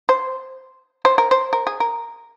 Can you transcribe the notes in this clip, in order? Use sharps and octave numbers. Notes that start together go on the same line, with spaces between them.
C5
C5
A#4
C5
A#4
G#4
A#4